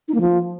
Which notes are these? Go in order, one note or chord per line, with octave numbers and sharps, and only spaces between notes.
D#4
A#3
F3